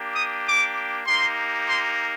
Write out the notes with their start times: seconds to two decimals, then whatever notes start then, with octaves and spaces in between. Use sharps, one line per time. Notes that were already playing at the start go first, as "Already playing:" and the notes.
Already playing: A#3 D4 G4
0.15 D#6
0.45 D6
1.06 A#3 D#4 G4 C6
1.69 C6